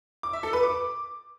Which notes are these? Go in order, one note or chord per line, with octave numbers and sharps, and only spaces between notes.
D6
E5
A4
B4
D6